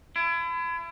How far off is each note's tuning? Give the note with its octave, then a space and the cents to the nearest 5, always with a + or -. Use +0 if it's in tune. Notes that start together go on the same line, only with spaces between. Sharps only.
E4 +35